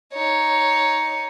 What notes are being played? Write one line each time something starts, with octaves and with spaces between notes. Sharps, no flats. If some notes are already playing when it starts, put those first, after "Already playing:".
D#4 C#5